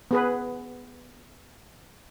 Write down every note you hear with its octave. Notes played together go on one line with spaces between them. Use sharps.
B3 G#4 B4